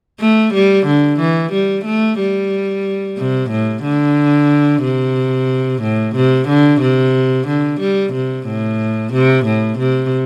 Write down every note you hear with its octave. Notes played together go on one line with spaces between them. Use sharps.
A3
G3
D3
E3
G3
A3
G3
C3
A2
D3
C3
A2
C3
D3
C3
D3
G3
C3
A2
C3
A2
C3